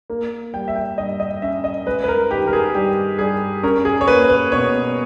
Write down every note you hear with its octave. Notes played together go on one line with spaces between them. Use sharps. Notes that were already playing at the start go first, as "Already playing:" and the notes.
A#3
G3 G5
E5
G5
G2 D#5
D#5
C#4 E5
D#5
G#3 B4
B4
A#4
D#3 G4
A#4
G#4
G2 G4
G2 G#4
C#4 A#4
G#4
C#5
A#3 B4
B4
B2 C#5